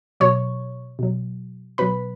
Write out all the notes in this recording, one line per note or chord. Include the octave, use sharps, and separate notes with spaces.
B2 F#3 C#5 C#6
B2 F#3
B2 F#3 B4 B5